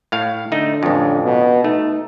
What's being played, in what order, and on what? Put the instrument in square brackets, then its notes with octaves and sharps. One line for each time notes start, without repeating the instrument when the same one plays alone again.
[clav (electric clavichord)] A2 F5
[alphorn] D3 [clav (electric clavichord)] A3 D#4
[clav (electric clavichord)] A1 F2
[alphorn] B2
[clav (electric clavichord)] A3 [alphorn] D#4